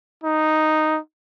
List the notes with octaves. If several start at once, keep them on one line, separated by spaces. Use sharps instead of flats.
D#4